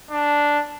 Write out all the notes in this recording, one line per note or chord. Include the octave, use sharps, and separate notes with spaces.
D4